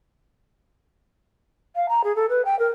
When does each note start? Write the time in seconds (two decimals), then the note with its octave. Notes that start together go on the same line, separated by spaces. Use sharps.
1.76 F5
1.89 A#5
2.04 G#4
2.16 A4
2.29 B4
2.45 G5
2.59 A#4